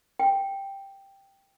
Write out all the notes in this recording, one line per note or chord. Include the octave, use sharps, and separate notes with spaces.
G5